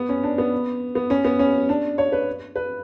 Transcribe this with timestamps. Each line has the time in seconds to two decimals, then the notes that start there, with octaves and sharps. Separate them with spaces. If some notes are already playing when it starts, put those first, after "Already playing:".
Already playing: B3
0.09 C#4
0.23 D4
0.38 B3
0.95 B3
1.10 C#4
1.25 B3
1.39 C#4
1.69 D4
1.98 C#5
2.12 B4
2.56 B4